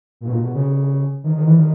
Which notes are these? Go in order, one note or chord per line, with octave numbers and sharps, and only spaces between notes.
A#2
B2
A#2
B2
C#3
D#3
D#3
E3
D#3